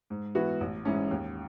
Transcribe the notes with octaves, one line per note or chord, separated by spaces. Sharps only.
G#2
E3 B3 F#4
A1
G#2 E3 G#3 C#4
D#2